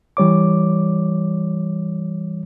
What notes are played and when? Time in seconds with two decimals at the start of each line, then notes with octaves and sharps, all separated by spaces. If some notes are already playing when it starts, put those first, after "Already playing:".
0.17 E3 G3 C#5 D6